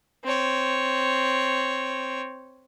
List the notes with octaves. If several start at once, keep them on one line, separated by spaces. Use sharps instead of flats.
C4 C#5